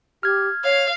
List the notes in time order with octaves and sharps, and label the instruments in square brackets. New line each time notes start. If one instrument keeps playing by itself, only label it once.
[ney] G4 [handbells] F6 G#6
[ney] C#5 [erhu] F5